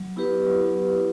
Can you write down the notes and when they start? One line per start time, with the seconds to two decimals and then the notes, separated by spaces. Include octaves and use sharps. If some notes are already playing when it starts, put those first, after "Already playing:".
Already playing: F#3
0.16 B3 E4 G4 B4
0.46 F#3